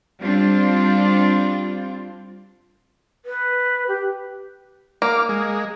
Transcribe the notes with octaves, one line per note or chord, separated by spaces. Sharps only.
G3 C4 D4 F4
B4
G4
A#3 D6 F6
G#3